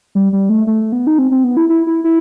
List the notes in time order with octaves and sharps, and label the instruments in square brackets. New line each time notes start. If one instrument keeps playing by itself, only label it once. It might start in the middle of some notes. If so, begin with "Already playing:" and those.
[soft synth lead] G3
G3
A3
A3
B3
D#4
C4
C4
B3
E4
E4
E4
E4